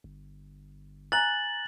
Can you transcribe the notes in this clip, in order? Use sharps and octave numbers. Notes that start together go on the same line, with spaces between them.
G1
G#5 A#5 F#6 A6 F#7